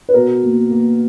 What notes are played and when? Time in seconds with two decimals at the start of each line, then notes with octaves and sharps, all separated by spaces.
0.09 B4
0.14 B2 A#4
0.43 A#3
0.71 A#3